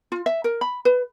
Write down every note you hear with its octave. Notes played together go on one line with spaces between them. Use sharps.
F4
E5
A#4
B5
B4